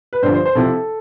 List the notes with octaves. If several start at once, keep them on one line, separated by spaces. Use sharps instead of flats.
B4
G2 D3 F3 C5
C5
C5
C3 F3 C4 E4 A4